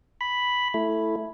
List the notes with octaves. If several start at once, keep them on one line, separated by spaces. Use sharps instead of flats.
B5
A3 E4